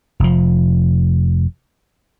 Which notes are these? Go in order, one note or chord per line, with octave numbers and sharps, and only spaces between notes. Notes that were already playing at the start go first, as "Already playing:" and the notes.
F1 F3